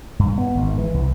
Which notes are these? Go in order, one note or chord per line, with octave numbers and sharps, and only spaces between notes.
G2
B3
G#1
E3
C2